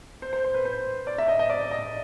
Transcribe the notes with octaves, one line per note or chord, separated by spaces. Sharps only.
C5
C5
C5
B4
C5
D5
E5
D#5
D#5
D5
D#5